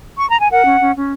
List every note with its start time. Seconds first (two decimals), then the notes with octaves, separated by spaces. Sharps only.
0.18 C#6
0.29 A#5
0.40 G#5
0.49 A#4 F#5
0.65 C#4
0.80 C#4
0.94 C#4